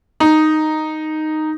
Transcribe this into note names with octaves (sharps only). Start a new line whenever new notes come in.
D#4